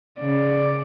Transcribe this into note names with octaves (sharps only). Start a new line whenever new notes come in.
C#3 D5